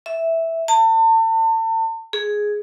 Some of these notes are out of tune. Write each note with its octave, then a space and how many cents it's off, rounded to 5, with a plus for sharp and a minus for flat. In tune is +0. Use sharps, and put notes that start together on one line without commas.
E5 -5
A5 +35
G#4 +5